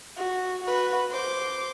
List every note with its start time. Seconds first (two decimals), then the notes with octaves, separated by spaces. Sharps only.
0.17 F#4
0.64 F#4 B4
1.10 C5 D6